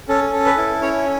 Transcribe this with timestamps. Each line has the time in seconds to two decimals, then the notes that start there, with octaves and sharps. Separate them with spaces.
0.08 C#4 A4
0.33 A4
0.45 B4
0.58 E4
0.82 C#4 C#5